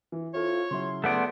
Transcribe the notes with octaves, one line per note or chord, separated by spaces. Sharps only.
E3
C4 E4 F4 A4 C#5
C#3 F#3 E4 C6
A3 B3 G#4 D5